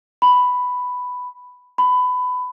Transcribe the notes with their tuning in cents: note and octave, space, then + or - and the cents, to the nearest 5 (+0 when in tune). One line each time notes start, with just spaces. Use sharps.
B5 +5
B5 +20